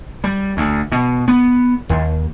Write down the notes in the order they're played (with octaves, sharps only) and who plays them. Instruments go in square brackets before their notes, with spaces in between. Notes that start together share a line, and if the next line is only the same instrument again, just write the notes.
[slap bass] G3
D2
B2
B3
D#2